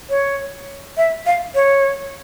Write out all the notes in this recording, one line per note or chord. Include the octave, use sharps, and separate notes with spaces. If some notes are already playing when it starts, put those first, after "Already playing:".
C#5
E5
F5
C#5